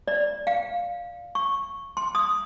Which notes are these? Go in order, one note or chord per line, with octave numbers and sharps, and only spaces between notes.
D5
F5
C#6
C6
D#6